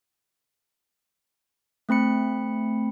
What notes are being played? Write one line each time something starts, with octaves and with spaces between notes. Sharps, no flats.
A3 C4 B5 C#7